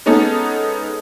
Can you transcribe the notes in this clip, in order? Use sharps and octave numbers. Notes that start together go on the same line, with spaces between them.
G#3 B3 C#4 D#4 A4